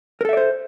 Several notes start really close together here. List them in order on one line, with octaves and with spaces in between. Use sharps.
A#4 A4 E5 D5 C5